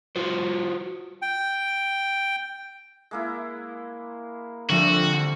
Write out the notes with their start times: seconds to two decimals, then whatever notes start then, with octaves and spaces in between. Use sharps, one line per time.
0.16 F4 F#4 C5
1.22 G5
3.11 G#3 A#3 E4
4.69 D3 F3 G3 A3 C4 F#4